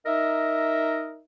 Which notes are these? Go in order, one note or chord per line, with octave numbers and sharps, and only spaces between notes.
D#4 A#4 D#5 E5